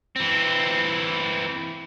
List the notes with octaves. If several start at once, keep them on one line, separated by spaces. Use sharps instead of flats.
E3 C4